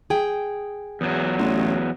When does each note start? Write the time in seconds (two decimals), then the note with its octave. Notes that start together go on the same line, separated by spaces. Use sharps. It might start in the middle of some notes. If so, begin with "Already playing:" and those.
0.10 G#4 G5
1.01 E2 F#3
1.38 A1